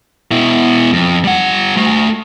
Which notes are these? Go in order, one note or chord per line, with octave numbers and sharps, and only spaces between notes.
B2 E4
F2
G3 F#5
A3 F#4